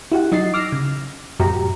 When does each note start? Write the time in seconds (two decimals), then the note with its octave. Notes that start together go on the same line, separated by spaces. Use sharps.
0.12 E4 F#4 G4 F#5
0.32 F#3 D#4 D#5 A6 C7
0.54 D6 E6 F6 A#6 C7
0.72 C#3
1.40 F#2 A2 C3 F#4 G4 A#5